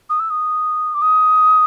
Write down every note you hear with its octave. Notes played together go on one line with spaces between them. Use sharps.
D#6
E6
D#6
D6
D#6